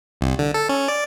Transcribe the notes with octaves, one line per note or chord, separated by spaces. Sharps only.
C2
D3
A4
C#4
D5